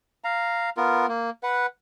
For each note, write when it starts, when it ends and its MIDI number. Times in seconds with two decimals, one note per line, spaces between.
0.24 0.70 77
0.24 0.70 82
0.77 1.06 59
0.77 1.06 65
0.77 1.06 70
1.08 1.30 58
1.43 1.66 71
1.43 1.66 78